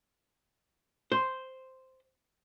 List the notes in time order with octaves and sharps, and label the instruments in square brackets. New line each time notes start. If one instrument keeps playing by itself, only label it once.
[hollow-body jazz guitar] C5